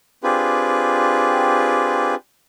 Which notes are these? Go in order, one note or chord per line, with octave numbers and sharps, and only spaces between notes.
C4 D4 F4 G4 G#4 B4